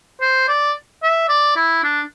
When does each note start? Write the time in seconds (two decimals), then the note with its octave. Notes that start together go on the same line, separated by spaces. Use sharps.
0.21 C5
0.48 D5
1.03 E5
1.29 D5
1.56 E4
1.84 D4